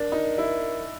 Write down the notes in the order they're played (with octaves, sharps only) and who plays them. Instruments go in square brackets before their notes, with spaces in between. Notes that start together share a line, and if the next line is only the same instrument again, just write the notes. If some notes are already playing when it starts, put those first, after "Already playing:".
Already playing: [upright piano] D4 [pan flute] A#4
[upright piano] D#4
E4